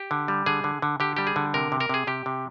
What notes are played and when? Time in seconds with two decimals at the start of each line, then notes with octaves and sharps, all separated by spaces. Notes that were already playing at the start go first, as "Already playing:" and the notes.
Already playing: G4
0.11 D3
0.28 G3
0.46 D3 G#4
0.64 D3
0.82 D3
1.00 D3 G4
1.17 G3 G4
1.27 G#4
1.36 D3
1.54 C3 A#4
1.72 C3
1.80 A#4
1.89 C3 G#4
2.07 C3 G4
2.26 C3